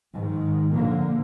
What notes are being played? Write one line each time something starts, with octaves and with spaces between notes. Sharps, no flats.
G#2 D#3
D3 F3 A#3